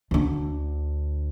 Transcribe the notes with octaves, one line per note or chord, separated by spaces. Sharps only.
D2 D3